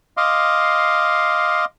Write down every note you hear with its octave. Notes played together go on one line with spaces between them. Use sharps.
D#5 F5 C6 D6